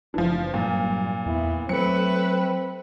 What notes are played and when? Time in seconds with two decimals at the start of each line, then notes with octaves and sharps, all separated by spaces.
0.14 F#1 E3 F3 D4
0.54 G2 A#2 F#3
1.26 E2 B3 E4
1.69 F#3 A3 C4 B4 C#7